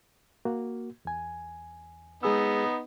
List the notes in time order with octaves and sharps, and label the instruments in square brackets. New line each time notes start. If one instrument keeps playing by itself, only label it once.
[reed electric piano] A#3 F#4
E2 G#5
[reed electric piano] G#3 G#4 E6 [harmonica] B3 D#4